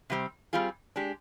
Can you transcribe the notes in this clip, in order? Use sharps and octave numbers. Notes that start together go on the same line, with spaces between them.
C3 G3 C4
G3 C4 F4 G#4
G#3 D4 G4